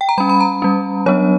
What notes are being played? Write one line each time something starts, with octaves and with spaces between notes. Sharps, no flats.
G5
A#5
G3 C#4 B5
B5
A#5
G3 C#4
F#3 B3 D4 C#5